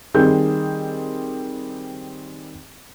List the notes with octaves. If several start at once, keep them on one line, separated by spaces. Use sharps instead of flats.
D#3 G3 C4 G#4 G6